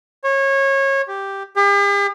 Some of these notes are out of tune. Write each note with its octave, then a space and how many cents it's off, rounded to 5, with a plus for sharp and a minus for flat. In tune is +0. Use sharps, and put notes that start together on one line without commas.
C#5 -25
G4 +0
G4 +45